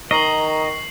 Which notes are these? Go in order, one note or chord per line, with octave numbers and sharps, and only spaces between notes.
D#3 D#5 A#5 C#6 C7 F#7